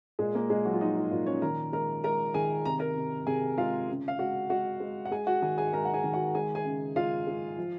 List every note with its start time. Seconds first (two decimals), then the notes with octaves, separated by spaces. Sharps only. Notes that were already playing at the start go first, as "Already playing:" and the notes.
0.19 A#2 G#3 G#4
0.35 A#3 A#4
0.50 A#2 G#3 G#4
0.65 F#3 F#4
0.73 F4
0.81 F3 D#4
0.96 F4
1.11 A#2 F4
1.26 C#4 C#5
1.42 D#3 A#4 A#5
1.72 G#3 A#4 A#5
2.04 G#3 A#4 A#5
2.34 D#3 G#4 G#5
2.65 C3 A#5
2.79 A#4 A#5
2.96 C3
3.27 C3 G#4 G#5
3.58 G#3 F4 F5
3.89 C#3
4.08 F5
4.19 G#3 F#4 F#5
4.50 G#3 F#4 F#5
4.80 G#3
5.05 F#5
5.11 G#3 G#4 G#5
5.27 F#4 F#5
5.42 D#3 G#4 G#5
5.58 G#4 G#5
5.73 G#3 A#4 A#5
5.85 F#5
5.94 G#4 G#5
6.04 D#3
6.14 F#4 F#5
6.35 G#3 G#4 G#5
6.55 G#4 G#5
6.65 C#3
6.96 G#3 F4 F5
7.27 G#3
7.57 F3